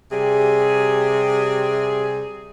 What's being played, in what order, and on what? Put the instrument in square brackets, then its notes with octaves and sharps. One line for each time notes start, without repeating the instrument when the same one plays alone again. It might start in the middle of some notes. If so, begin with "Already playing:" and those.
[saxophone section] C3 G3 G#4